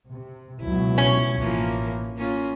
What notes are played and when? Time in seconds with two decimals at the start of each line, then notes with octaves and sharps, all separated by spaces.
0.12 C3
0.61 C#2 B2 F#3 E4
0.98 C#4
1.38 A1 E3 F3 A#3
2.17 A#3 C#4 F4